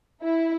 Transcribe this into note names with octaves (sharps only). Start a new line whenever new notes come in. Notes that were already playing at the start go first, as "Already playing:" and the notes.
E4